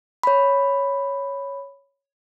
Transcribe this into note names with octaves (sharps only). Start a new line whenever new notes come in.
C#5 B5